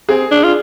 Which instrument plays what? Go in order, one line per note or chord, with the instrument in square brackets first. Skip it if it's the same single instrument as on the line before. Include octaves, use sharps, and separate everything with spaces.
[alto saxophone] C4 [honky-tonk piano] G#4
[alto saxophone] D4
F4